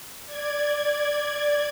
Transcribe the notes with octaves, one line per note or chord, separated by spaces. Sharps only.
D5 G#6